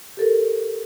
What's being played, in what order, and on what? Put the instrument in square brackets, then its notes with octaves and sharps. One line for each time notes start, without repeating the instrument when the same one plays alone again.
[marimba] G4 A4 A#4